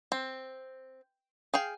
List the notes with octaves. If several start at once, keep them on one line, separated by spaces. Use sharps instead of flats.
C4
G#4 F5 G5